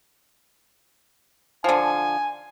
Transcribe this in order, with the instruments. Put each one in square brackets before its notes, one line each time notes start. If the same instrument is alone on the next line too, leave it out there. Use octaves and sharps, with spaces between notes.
[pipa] D3 F3 [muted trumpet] G#5